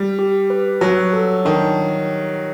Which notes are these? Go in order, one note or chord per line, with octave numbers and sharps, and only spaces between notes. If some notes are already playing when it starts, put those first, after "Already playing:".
Already playing: G3
G4
B4
F#3 F#4
A4
D#3 D4